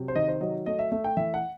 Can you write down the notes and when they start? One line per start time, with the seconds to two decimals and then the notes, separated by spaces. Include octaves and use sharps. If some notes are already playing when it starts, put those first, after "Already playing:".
Already playing: C3 F#3
0.08 C5
0.16 D#3 D#5
0.28 C5
0.41 F#3 D#5
0.66 A3 D#5
0.79 E5
0.92 A3 E5
1.04 G5
1.17 E3 E5
1.34 F#5